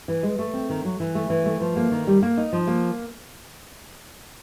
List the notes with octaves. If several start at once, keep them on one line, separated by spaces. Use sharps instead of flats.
E3
G#3
A3
C4
D#3
F#3
E3
A3
E3
A3
F3
A#3
D#3
G3
A#3
D#4
F3
A#3